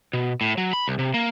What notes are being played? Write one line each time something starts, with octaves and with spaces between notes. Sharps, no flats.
B2
A2
F#3
B5
C2
C3
A#3